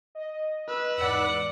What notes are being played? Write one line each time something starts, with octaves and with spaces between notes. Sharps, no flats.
D#5
B4 E6
E2 G#2 D5 F#5